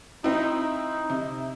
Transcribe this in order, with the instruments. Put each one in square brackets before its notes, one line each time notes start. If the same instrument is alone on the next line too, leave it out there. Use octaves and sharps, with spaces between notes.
[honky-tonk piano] C4 E4 [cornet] D#4
[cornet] D#4
[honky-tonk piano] C3